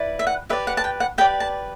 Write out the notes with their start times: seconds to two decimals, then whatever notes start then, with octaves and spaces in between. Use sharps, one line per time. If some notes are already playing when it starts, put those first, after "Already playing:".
Already playing: E4 B4 D5
0.19 E5
0.27 F#5
0.49 G4 B4 D5 E5
0.67 F#5
0.77 A5
0.84 G5
1.00 F#5
1.18 G4 B4 D5 G5
1.40 A5